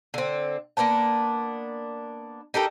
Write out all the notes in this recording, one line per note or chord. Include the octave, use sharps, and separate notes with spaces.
D3 C4
A#3 B3 D4 A5
D#4 G4 A4 A#4